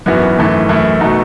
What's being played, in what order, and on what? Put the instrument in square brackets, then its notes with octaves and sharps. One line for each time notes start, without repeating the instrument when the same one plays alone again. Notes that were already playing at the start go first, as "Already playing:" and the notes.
[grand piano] G#1 F#2 E3 B3 F#4
G#1 F#2 E3 A3
F#2 E3 A3 E4
B2 A3 D#4 F#4